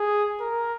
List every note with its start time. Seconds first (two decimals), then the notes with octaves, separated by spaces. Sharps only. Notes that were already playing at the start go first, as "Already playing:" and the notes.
Already playing: G#4
0.40 A#4